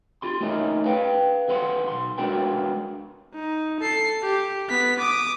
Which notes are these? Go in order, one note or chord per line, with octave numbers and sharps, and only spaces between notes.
F4 G4 C6
A3 A#3 C#4 D#4 A#4
B4 F5 G5
D#2 B4 F5 F#5 C6
B1 C6
G#3 B3 D4 F#4 A#4 G5
D#4
A4 C7
G4
B3 B6
D6 D#6